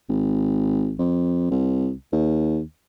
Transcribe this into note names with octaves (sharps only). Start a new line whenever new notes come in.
G#1
F2
C2
D#2